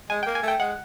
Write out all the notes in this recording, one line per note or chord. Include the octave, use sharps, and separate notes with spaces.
G#3 G#5
G5
A#3
G#5
A3
G5
G#3 F#5